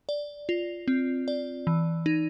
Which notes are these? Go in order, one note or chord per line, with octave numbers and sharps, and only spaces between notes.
D5
F4
C4
D5
E3
D#4